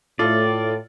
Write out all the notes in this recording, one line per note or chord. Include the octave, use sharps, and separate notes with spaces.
A2 F4 A4 D5